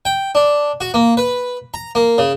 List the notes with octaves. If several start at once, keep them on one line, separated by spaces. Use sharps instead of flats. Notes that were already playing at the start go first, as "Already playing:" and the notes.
G5
D4
F#4
A#3
B4
A#5
A#3
C#3